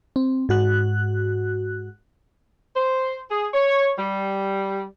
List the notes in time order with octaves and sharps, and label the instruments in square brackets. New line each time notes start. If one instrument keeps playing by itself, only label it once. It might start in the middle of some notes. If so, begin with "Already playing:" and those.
[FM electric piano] C4
G#2 F#4 F#6
[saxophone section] C5
G#4
C#5
G3